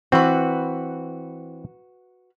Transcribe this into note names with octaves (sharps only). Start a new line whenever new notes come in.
E3 C4 F#4 B4